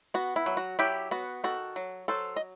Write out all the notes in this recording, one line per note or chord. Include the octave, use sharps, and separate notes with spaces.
B3 F#4
E4
F#3
F#4
F#3 E4 G4
B3 F#4
D#3 F#4 A4
F#3
F#3 A4 C5
D#5